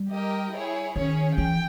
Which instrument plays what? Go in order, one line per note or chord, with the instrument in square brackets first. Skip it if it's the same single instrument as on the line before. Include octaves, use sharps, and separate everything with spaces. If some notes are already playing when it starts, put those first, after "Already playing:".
Already playing: [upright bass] G3
[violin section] G4 A#4 D#5 G5
E4 G#4 C#5
[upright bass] D#3 [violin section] C#4 G#4 C#5
[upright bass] E3 [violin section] G5